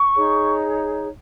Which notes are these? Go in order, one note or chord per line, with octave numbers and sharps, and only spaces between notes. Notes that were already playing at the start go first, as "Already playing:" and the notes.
Already playing: C#6
D#4 G#4 C#5